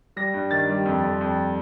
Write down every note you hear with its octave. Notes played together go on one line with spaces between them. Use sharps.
G3 A#6
G2
D#3 A6
G3
F2
F2
F2